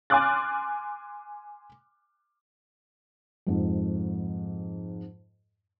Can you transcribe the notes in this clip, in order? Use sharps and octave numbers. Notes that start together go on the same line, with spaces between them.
G#5 C6 D6 F6 F#6 A6
F2 G#2